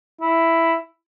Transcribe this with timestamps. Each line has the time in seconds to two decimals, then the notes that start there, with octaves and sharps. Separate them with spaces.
0.21 E4